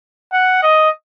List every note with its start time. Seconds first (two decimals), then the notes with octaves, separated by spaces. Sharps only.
0.33 F#5
0.62 D#5